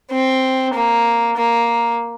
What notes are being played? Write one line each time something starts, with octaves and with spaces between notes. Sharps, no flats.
C4
A#3
A#3